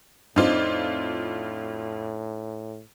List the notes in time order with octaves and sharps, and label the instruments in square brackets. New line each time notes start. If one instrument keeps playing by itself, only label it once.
[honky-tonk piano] F2 F4 [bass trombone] A2 [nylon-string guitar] D4 D#4 C5